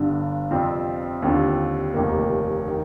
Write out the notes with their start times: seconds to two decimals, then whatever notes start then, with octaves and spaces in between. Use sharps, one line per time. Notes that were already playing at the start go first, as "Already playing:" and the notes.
Already playing: G1 G2 D3
0.50 F2 C3 G3 C4 F4
1.22 D#2 D3 G3 C4 F4
1.94 F1 D#2 D#3 A#3
2.68 D#3